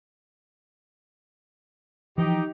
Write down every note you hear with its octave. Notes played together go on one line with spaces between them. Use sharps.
E3 F3 D#4 G4